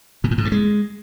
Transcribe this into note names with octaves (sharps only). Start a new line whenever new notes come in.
A#2
A2
G#2
G2
G#3